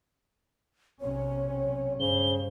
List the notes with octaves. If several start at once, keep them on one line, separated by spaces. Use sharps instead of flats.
B1 C3 C#4 C#5
G2 C#3 C5 G7